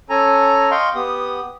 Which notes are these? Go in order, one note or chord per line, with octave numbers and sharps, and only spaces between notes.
C#4 A4 G#5 A#5
D#5 F5 G5 C6 C#6
B3 G4 D#6